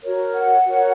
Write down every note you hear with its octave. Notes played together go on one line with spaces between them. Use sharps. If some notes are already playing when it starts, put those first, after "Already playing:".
F#4 A#4 C#5
F#5
F#4 A#4 C#5